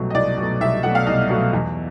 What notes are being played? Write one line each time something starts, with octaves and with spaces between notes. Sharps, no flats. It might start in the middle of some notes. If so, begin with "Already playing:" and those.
Already playing: C2 B2 F#3 A3
D#5
C2 D5
B2 F#3 A3
C2 E5
B2 F#3 A3 F#5
F5
C2 D#5
B2 F#3 A3
E2